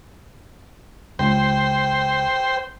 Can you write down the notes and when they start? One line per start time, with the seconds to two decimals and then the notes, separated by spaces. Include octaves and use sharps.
1.19 C#2 C5 G5